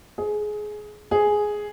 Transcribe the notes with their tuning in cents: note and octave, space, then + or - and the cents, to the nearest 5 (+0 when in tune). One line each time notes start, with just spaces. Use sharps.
G#4 +20
G#4 +5